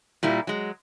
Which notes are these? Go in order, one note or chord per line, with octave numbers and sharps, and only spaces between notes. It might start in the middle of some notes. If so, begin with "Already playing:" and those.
A#2 G3 A#3 E4
F#3 G#3